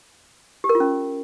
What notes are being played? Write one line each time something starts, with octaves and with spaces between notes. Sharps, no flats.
G4
A#4
F4
C#4